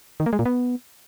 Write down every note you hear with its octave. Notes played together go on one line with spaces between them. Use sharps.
D#3
A#3
G#3
A#2
B3